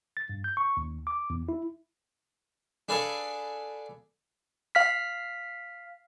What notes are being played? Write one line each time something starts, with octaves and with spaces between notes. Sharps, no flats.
A6
G2
G6
C#6
D#2
D6
E2
E4
D4 G#4 A4 B4 F5 G#5
F5 F6 B6